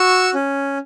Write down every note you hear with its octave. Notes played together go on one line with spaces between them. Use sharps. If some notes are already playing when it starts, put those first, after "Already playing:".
Already playing: F#4 C#6 E6
C#4